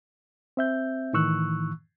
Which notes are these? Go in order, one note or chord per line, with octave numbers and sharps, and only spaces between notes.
C4 E5 G6
A2 D#3 E3 C#6 E6 F#6